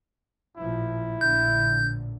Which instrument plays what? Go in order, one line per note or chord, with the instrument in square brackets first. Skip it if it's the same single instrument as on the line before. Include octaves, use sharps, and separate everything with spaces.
[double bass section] A1 A#2 F3 [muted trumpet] E4
[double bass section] A#1 A2 D3 [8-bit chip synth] G6